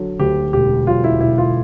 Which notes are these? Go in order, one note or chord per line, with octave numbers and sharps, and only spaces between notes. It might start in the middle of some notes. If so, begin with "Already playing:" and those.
Already playing: D3 F#3
D2 G4
E1 G4
F#3 F4
E4
E1 E4
F4